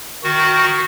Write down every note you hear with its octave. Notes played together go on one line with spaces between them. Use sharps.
D#3 F#4